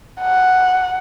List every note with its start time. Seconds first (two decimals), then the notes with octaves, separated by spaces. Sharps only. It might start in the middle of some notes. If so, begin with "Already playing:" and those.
0.21 F#5